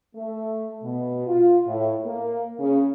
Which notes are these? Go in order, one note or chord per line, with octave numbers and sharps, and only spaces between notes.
A3
B2
F4
A2
A#3
C#3